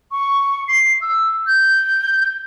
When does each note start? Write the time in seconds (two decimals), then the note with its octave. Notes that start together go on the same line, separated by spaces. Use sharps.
0.12 C#6
0.68 C7
1.01 E6
1.46 G6